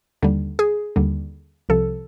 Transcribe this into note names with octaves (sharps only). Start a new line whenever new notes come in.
D#2 D3 G3
G#4
D#2 D3 G3
C2 C3 F3 A4